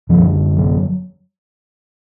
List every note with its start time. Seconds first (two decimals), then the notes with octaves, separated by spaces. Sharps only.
0.09 F#2 D3 F3
0.57 F#3